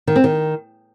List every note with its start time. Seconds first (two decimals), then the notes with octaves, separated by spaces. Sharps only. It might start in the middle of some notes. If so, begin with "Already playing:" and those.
0.07 D#3
0.16 C4
0.24 D#3